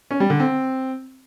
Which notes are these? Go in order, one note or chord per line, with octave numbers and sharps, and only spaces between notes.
C#4
G3
D3
C4